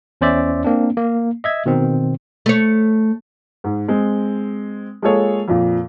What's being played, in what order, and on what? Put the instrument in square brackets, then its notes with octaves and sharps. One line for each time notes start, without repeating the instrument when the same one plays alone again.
[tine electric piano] E2 C#4 C5 D5 E5
A#3 C4 D4
A#3
D#5 E5 G#6
B2 D#3 C4
[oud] A3 C#5
[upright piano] G#2
G#3 C4
G#3 A#3 F4 G#4 A4 C#5
F2 A#2